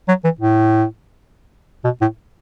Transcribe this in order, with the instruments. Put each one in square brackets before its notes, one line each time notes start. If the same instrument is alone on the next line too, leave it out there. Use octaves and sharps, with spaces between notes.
[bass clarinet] F#3
E3
A2
B2
A2